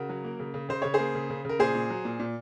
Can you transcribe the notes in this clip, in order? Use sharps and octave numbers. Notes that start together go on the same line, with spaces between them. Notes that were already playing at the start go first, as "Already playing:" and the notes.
Already playing: C#3 F#4 A#4
F#3
A#3
C#3
C#3
C#3 C5
C#3 C#5
G#4 C5
A#3
C#3
C#3
C#3 A#4
A#2 G#4 C5
A#2
F#3
A#2
A#2